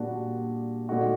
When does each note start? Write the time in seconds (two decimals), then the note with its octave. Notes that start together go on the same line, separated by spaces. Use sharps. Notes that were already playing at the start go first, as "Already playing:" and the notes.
Already playing: A#2 G3 D4 F#4
0.89 A#2 A3 D#4 F#4